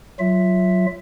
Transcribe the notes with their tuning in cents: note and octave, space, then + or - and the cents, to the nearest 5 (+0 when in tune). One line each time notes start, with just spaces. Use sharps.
F#3 +0 F4 +0 E5 +0